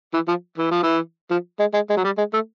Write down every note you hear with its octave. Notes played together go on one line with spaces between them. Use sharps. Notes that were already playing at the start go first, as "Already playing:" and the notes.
E3
F3
E3
F3
E3
F3
G#3
G#3
G#3
F#3
G3
G#3
A3